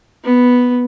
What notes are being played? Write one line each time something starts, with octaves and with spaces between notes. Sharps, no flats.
B3